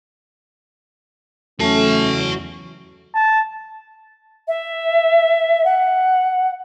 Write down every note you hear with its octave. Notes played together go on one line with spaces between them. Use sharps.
E2 F#3 A3 C#4 F#4 A5
A5
E5
F#5